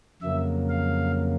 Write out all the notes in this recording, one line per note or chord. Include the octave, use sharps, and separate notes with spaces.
F2 C#3 F#3 A#3 E5
F5